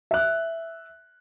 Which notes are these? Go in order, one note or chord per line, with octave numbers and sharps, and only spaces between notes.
E5 F#6